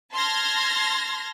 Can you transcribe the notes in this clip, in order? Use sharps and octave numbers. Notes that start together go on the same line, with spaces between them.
A5 C6 F6 G#6 A#6